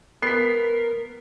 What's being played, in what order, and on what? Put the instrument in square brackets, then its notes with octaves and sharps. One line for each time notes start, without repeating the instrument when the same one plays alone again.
[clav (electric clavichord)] B3 [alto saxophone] A#4 [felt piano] B6 C7